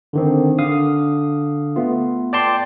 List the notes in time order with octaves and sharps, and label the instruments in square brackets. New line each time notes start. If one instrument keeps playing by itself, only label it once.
[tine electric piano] D3 D#3 C4
D3 F5 D#6
A3 B3 F4
D5 G5 A5 C6